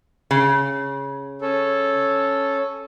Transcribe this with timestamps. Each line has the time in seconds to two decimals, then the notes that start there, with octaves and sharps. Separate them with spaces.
0.31 C#3
1.41 C#4 A4